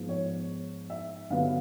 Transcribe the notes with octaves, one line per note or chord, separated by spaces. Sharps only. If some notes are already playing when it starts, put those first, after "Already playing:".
Already playing: G#2 F3 G#3 B3
C#5
E5
G2 D3 F#3 B3 F5